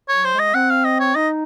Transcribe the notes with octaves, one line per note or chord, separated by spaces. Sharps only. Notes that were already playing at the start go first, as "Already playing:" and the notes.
F#3 C#5
C5
G#3
D#5
A#3
C4 F#5
F5
D#5
C#5
D#4 D#5